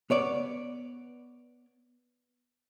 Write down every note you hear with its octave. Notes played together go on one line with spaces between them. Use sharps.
B3 C#5 D5